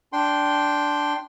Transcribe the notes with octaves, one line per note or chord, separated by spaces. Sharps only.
D4 G5 C6